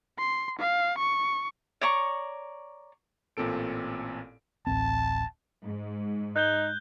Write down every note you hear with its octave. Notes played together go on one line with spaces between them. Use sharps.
C6
F5
C#6
C#5 D5 A#5 C#6
A1 A#2 C4 A4 D7
D1 A1 C4 A5
G#2
D#4 F#6 G6 G7